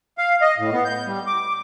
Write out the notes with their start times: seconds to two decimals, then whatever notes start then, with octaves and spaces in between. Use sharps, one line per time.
0.18 F5
0.42 D#5
0.58 A2
0.73 B3
0.85 G6
1.07 G3
1.27 D6